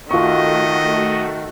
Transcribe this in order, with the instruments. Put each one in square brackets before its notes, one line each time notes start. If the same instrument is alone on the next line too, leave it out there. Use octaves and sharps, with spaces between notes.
[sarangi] D#3 [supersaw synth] A3 F#4 [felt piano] F4 C#6 [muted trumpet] D#5